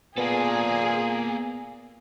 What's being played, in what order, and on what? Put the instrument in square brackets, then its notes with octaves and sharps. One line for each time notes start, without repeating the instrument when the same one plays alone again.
[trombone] A#2 [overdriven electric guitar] A#3 A4 [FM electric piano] B3 [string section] G#4